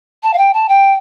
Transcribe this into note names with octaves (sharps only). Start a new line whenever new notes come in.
A5
F5
G5
A5
G5